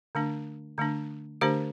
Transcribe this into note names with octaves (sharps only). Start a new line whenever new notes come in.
D3 A3 D4
D3 A3 D4
D3 A3 D4 G4 C5